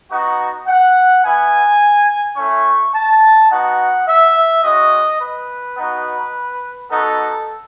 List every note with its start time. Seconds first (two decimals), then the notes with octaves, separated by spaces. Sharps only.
0.11 B3 D#4 F#4
0.67 F#5
1.24 B3 E4 G#5
2.37 A3 C#4 E4 C#6
2.94 A5
3.50 B3 D#4 F#4 F#5
4.07 E5
4.63 G#3 C#4 F#4 D#5
5.20 B4
5.77 B3 D#4 F#4
6.90 B3 D#4 F#4 A4